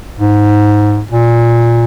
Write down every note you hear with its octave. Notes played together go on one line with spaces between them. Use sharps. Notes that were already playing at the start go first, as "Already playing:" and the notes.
G#2
A#2